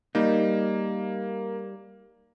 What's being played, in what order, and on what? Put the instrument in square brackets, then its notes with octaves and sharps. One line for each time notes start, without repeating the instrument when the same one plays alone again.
[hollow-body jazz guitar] G3 D#4 [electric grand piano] A#3